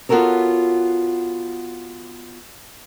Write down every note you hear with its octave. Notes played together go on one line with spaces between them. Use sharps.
B3 F4 F#4 A4 A#4 C#5